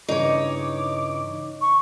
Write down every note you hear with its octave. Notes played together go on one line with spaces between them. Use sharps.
G2 C#3 E3 D#4 C#5 D6
C#6